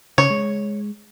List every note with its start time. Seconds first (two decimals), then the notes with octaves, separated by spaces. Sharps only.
0.18 C#3 C#5
0.30 G#3